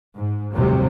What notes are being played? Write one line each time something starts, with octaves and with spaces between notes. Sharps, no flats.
G#2
F1 D#2 A2 C3 F#3 G3